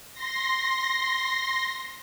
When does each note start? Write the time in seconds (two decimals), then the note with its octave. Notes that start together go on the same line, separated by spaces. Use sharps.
0.13 C6 A#6